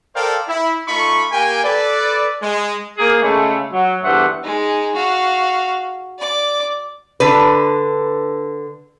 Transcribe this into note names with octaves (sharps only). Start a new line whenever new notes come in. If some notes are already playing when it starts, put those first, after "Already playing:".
A4 A#4 C5 D5 F5 G5
E4
A3 D#4 F4 B5 C#6
A#3 G4 A#4 G5 G#5
A4 B4 D5
G#3
A#3 G#4
C#3 G#3 A3
F#3
E2 G2 A3 C5 F#5
G#3 D#4
F#4 F5
D5 D6
D3 B4